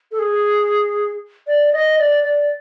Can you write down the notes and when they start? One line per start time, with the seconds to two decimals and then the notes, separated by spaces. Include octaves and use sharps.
0.12 A4
0.19 G#4
1.47 D5
1.73 D#5
1.99 D5
2.24 D5